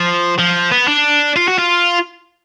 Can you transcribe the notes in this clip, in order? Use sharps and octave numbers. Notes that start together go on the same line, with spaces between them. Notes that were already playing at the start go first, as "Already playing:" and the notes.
Already playing: F3
F3
B3
D4
F4
F#4
F4